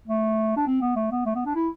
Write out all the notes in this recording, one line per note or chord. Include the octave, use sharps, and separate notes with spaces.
A3
D4
C4
B3
A3
B3
A3
B3
D4
E4